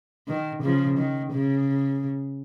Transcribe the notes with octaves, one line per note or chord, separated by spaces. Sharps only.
D#3
C#3 F3
D#3
C#3